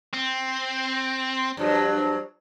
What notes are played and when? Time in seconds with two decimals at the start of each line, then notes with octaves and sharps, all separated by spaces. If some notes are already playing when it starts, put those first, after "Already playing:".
0.13 C4
1.57 G2 F3 F#3